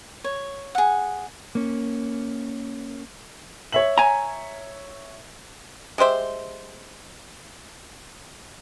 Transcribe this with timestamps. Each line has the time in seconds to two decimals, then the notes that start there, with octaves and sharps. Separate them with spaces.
0.24 C#5
0.75 G#4 F#5
1.55 A#3 C#4
3.72 C#5 E5 F#7
3.98 G#5 A#5
5.98 G#3 G4 C5 E5